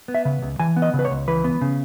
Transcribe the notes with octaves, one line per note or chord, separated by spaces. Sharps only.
B3
E5
C#3
C#2
E3 G#5
B3
D#5
C#3
B4
C#5
C#2
E3 B4
B3
C#3